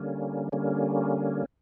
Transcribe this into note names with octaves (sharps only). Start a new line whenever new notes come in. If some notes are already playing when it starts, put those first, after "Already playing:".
Already playing: D3 G3 A#3 C#4
D3 G3 A#3 C#4